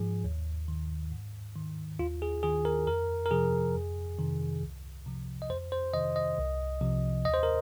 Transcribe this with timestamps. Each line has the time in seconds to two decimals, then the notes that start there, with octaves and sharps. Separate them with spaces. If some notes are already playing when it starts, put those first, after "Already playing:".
Already playing: G#2 F3 G#4
0.24 D#2
0.68 D#3
1.12 G#2
1.56 D#3
1.99 D#2 F4
2.22 G#4
2.43 D#3 G#4
2.65 A#4
2.87 F2 A#4
3.26 A#4
3.31 C3 F3 G#4
3.75 F2
4.19 C3 D#3
4.62 C2
5.06 C3 F3
5.42 D#5
5.50 F2 C5
5.72 C5
5.94 C3 D#3 D#5
6.16 D#5
6.38 C2
6.81 C3 F3
7.25 D#2 D#5
7.34 C5
7.43 A#4